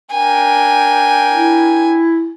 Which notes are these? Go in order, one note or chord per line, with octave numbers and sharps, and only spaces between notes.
D4 A#4 G5 G#5
E4